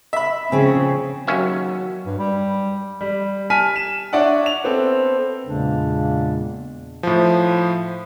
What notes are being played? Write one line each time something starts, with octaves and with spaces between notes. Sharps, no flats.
E5 B5
C#3 F3 C4 G#4
D#2 F#3 C#4 E5
G2
G3
G3
G#5 A5 F6 B6 D#7
E7
D4 C#5 D5 E5 F#5
F7
B3 C4 A4
E2 A#2 C#3 G#3 A#3 D4
A2 F3